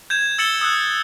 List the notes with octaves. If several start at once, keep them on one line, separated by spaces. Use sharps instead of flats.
G6 G#6 E7
E6 A6 C#7 E7 F#7 G7
D#6 E6 F#6